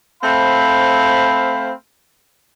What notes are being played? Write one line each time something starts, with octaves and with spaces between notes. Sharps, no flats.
A3 C4 C5 F5 B5